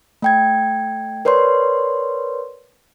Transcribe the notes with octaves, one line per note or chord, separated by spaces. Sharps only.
A3 G5 G#6
A#4 B4 C#5 D5 C6